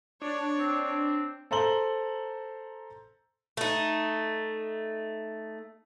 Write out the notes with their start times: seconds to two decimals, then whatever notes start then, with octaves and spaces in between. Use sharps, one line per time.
0.22 D4 C#5
0.58 C4
1.51 A4 C5 A#5 C6 F#7 G7
3.57 A3 D#4